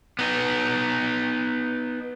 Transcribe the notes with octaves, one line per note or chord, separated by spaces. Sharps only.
B3 D#4